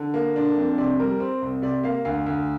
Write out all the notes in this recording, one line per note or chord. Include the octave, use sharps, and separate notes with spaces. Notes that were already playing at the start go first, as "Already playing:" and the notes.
Already playing: D3
A#3
D4
F2
C3 D5
G3 A#4
C4
C2
C3 D5
A#3 F5
D2 F5
D2